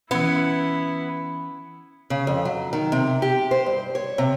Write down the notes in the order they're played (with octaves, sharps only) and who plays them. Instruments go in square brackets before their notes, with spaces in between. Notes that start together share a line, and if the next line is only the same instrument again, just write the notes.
[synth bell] E3 C#4 [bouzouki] B3 [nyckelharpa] E4
[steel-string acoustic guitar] C#3
F2
F#3
D#3
C3
G4
C5
G2
C#5
C3